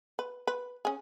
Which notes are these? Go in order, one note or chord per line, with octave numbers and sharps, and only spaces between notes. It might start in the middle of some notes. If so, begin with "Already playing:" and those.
B4
B4
C#4 G#4